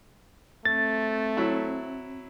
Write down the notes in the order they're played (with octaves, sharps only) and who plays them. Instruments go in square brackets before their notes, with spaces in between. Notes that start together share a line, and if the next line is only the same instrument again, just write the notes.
[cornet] A3 [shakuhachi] C4 [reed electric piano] A6
[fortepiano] F#3 E4